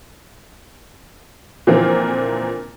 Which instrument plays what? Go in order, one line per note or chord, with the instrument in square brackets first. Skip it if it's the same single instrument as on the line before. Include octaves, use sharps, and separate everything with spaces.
[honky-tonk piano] A#2 D3 E3 F3 A#3 C4